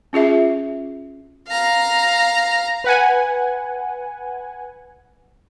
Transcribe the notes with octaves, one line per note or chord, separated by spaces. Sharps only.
C#4 F4 G#4 E5
F5 A#5
B4 F#5 G#5